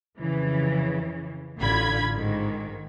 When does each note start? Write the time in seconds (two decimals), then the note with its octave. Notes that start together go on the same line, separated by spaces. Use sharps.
0.18 F2 C#3 E3
1.59 A1 D3 F4 B5 G#6
2.15 G#2 D#3